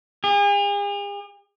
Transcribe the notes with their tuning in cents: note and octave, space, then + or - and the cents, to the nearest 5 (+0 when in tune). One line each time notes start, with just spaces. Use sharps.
G#4 -45